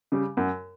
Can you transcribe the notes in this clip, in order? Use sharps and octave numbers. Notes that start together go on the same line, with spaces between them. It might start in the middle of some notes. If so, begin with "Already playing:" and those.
C#3 G3
F#2